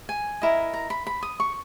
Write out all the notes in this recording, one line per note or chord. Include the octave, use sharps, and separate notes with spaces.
G#5
E4 A#4 D#5
A#5
B5
B5
D#6
C#6